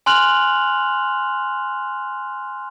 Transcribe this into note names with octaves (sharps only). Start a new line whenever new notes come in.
G#5 C6 F6 F#6 F7 F#7